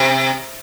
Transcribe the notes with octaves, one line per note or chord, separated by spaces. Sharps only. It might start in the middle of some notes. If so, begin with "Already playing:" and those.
Already playing: C3